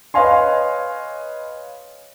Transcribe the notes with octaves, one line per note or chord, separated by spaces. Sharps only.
B4 C#5 D#5 F5 G#5 C6